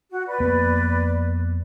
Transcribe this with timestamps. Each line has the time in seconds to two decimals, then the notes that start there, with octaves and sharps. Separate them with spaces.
0.11 F#4
0.28 B4 D5
0.40 F2 A#3 B3